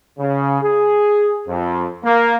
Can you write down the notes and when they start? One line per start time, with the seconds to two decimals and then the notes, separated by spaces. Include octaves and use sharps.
0.19 C#3
0.63 G#4
1.48 F2
2.03 A#3